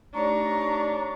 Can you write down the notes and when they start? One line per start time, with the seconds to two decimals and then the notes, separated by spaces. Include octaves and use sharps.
0.14 A3 D4 D#4 G4 C#5 D5 A#5 C#6